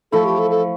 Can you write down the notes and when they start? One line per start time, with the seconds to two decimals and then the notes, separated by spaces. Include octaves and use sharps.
0.12 F3 A3 E4 A4
0.26 G4
0.38 A4
0.50 A4